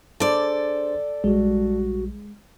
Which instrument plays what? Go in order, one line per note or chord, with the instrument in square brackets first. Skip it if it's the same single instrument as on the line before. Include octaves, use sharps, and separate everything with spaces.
[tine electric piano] D4 G#4 C5 [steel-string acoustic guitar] A4 D5
[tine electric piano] A#1 G3 [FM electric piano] G#3 [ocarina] F#4